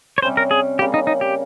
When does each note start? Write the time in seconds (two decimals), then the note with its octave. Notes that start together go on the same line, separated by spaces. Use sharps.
0.18 C#5
0.22 C3 G3 C#4 C5
0.37 A#4
0.51 G#4
0.79 C#3 G3 A#3 G4
0.94 D#4
1.07 D#4
1.21 G4